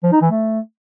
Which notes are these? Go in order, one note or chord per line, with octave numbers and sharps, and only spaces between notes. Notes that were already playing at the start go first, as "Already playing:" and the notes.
F3
D#4
E3
A3